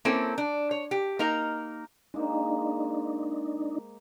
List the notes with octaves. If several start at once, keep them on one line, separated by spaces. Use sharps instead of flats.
A#3 C4 C#4 E4 A4
D4
C#5
G4
A#3 D#4 A#4
G#3 A#3 D4 D#4 C5